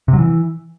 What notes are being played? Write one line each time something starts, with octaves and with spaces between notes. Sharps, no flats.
C3
F#3
E3